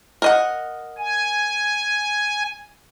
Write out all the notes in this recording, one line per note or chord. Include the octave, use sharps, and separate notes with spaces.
A#4 D#5 F#5
G#5